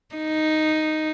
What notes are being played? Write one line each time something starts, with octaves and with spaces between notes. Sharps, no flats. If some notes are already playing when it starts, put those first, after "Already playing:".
D#4